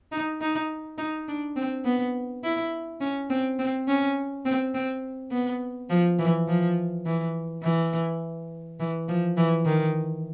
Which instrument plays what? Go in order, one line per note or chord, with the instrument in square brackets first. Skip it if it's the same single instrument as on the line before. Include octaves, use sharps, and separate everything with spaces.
[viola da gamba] D#4
D#4
D#4
D4
C4
B3
E4
C#4
C4
C4
C#4
C4
C4
B3
F3
E3
F3
E3
E3
E3
F3
E3
D#3